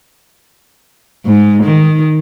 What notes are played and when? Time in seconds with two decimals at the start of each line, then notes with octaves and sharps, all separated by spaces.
1.26 G#2
1.64 D#3